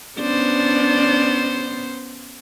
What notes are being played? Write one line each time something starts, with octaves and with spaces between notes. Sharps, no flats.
B3 C#4 D4 C5 D5